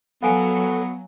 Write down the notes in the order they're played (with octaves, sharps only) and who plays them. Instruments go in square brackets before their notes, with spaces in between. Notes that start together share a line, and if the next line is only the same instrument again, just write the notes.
[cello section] F#3 [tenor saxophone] B3 [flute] A4 [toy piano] F5 G#5